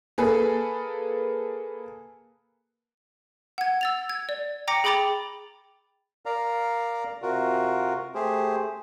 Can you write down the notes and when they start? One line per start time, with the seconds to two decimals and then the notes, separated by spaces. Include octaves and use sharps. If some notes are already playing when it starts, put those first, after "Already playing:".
0.18 A#3 G#4 A4 B4
3.58 F#5 G#6
3.81 E6 A6 F7
4.10 G#6
4.29 D5
4.67 G5 A#5 D6 A#6 C#7
4.84 G#4 G5 B5 D6 A6 F7
6.26 A#4 D5 F5 A#5
7.22 C3 F4 F#4 A#4
8.15 A3 G4 G#4 C5